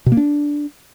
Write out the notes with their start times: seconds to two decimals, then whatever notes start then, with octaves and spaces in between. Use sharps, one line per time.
0.06 B2
0.12 A#3
0.17 D4